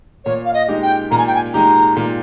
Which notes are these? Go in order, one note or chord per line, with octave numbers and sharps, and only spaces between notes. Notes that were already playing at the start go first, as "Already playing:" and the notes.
A#2 C#5
F5
D#5
G#3 D#4 G4
G5
A#2 A#5
G#5
G5
G#5
G#3 D#4 G4 A#5
A#2